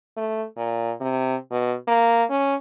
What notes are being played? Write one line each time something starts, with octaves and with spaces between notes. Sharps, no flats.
A3
A#2
C3
B2
A#3
C#4